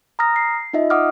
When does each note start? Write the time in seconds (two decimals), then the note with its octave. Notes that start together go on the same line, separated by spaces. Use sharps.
0.19 A#5 D#6 F6 A#6
0.36 C7
0.73 D#4 F4 D#5 E5
0.90 F#5 D6 D#6 F6